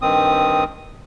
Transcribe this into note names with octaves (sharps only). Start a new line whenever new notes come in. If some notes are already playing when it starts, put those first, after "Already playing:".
G2 D#3 C4 D#6